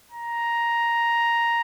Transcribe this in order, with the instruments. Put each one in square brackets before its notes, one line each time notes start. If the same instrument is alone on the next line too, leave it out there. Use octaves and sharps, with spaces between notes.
[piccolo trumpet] A#5